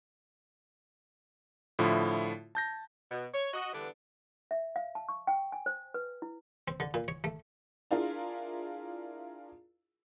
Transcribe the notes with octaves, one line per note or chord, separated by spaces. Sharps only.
A2 D3 F3 E4 F4
A5 G6 A#6
B2
C#5
F#4 D#5
D3 E3 G3 B3 D4
E5
F5
A5
C#6
G5
G#5
C5
B4
E4
C4
D3
A#2
C#5
A3
D4 E4 F4 G#4 A#4